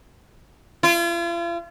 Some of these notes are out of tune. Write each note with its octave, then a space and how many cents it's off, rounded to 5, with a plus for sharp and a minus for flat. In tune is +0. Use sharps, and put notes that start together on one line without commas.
F4 -40